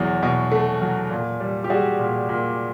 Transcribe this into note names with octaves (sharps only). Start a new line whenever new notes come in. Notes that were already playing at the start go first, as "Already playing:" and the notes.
Already playing: E2 F#3 G#4
B2
A3
F#3
A#2
G3
G4
G3 F#4 G#4
A#2
A#2